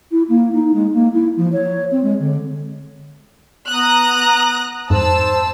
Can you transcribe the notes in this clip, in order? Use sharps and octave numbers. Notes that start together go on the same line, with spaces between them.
E4
A#3
D#4
G#3
A#3
E4
F3
C#5
C4
G#3
D3
B3 A#5 D#6 F#6
F2 G#2 C5 A5 E6